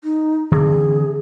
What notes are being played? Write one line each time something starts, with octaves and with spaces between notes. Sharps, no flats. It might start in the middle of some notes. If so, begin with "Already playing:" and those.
D#4
D3 E3 C4 G#4